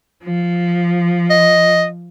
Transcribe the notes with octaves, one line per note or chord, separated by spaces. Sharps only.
F3
D#5